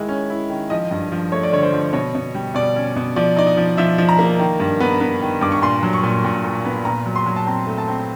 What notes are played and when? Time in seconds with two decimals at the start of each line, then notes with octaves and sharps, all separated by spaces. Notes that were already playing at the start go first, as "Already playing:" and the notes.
Already playing: D#3 G#3 E4
0.09 C#4
0.30 E4
0.50 D#3
0.70 F3 D#5
0.91 G2
1.12 F3
1.32 A3 C#5
1.43 D5
1.52 D3 C#5
1.63 C5
1.73 F3
1.93 B2 C#5
2.15 B2
2.35 G3
2.54 B2 D5
2.76 C#4
2.96 B2
3.16 F3 D5
3.36 D#4 D5
3.47 D#5
3.57 F3
3.77 F3 E5
3.98 F3
4.09 A#5
4.19 A#3
4.39 D#3
4.60 G2
4.80 B3
5.00 B3
5.21 D#3
5.41 G2 D6
5.52 C#6
5.62 A#2 C6
5.83 F#3
5.93 C#6
6.03 A#2
6.24 A#2
6.45 A#2
6.65 B3
6.85 A#2 A#5
7.06 F#3
7.16 C6
7.26 F#3
7.36 A5
7.47 C4 A#5
7.67 A3
7.78 A5
7.88 C4